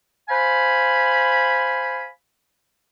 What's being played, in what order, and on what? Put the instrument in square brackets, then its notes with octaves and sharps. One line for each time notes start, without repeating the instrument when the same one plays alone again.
[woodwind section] C5 F5 G#5 B5